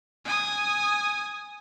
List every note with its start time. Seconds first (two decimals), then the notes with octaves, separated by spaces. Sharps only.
0.25 G#5 D#6